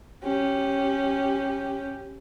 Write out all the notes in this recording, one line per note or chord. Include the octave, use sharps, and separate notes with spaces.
C#4 G4